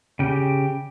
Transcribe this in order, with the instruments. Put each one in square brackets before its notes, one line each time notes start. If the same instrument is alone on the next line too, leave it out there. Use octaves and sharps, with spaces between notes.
[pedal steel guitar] C#3 G4